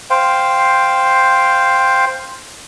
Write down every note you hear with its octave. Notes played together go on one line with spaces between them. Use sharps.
C5 F5 G5